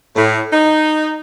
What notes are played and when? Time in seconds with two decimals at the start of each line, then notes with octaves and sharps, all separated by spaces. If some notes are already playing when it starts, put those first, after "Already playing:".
0.16 A2
0.52 D#4